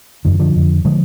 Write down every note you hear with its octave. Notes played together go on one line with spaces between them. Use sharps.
F#2 D3 D#3
D3 F3
F2 D3
D3 F3 G#3